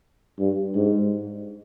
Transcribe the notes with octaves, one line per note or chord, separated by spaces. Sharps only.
G2
G#2